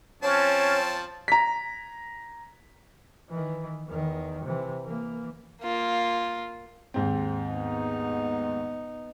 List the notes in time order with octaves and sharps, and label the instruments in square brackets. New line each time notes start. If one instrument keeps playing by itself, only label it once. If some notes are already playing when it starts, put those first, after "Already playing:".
[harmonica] F3 C4 A5 [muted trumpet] C#4 [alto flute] C#5
[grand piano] A#5 B6
[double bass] D#3 E3
E2 D#3
C3 E3
E3 A#3
[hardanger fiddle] A#3 F4
[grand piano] D#2 G#2 C4
[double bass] B3 D#4